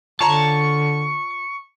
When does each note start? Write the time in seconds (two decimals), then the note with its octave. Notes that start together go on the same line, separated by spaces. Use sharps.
0.21 D3 F4 C#5 A5 A#5 C#6